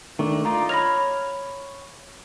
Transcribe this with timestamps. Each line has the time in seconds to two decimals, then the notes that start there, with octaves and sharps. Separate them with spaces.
0.19 D#3 A3 D4
0.45 D#4 F4 D5 A#5
0.69 C#5 B5 F6 A#6 F7